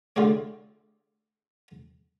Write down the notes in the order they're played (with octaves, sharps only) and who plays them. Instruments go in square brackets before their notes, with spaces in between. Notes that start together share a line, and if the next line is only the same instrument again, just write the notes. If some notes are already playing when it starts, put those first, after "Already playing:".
[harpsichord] D3 E4 F4 G4 G#4 C#5